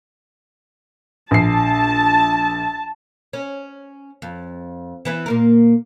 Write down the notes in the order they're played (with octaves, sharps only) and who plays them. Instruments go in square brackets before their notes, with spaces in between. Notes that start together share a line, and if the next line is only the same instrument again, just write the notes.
[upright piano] A#1 C7 [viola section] A5
[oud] C#4
F2
E3 B3 E4
A#2 A#3 A#4